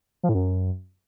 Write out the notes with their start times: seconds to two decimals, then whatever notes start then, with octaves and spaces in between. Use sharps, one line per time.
0.23 F3
0.29 A2
0.35 F#2